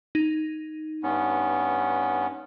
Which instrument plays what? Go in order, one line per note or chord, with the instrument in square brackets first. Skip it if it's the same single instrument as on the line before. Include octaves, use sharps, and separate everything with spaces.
[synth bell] D#4
[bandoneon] G2 B3 C#4